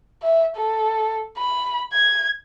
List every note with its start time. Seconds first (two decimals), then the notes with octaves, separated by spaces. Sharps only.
0.23 E5
0.56 A4
1.38 B5
1.93 G#6